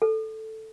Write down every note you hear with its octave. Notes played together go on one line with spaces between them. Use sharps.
A4